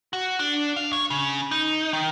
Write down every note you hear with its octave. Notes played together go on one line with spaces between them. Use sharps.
F#4
D4
F5
C#5
C#3
D#4
D#3